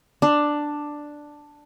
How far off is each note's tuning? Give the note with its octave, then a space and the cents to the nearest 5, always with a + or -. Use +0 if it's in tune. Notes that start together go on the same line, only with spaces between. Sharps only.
D4 +5